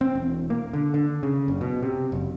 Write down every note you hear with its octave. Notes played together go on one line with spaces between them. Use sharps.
C4
E1
A#3
D3
D3
C#3
F#1
B2
C3
F#1